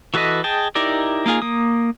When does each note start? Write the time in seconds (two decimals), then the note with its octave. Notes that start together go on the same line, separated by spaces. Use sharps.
0.14 E3 F#4 A4 B4 D#5
0.44 G#4 D#5 G5 A5
0.75 D#4 E4 G4 A#4 D5
1.26 A#3 D#4 F4 G#4
1.42 A#3 D#6